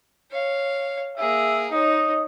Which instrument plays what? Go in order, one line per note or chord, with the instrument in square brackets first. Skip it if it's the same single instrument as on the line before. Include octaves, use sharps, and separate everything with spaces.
[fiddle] C#5 F5
[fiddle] A#3 G#4 [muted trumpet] E5
[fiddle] D#4 C#5 [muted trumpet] D#5